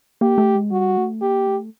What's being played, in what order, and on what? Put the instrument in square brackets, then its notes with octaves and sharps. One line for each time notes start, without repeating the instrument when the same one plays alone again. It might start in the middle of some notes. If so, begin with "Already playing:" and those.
[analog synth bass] A#3 [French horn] G4
[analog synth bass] A3
G#3
[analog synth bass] G3 [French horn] F#4
[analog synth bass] A3
[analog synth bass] A#3 [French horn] G4
[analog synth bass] A3